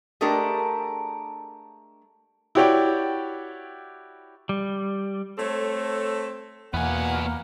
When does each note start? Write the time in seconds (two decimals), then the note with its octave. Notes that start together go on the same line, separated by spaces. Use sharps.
0.21 G#3 A3 D4 G4 A4 A#4
2.55 E4 F#4 G4 C#5 D5 G5
4.49 G3
5.38 A3 C4 A4 C#5
6.74 E2 B2 A#3 B3 F#5 G#5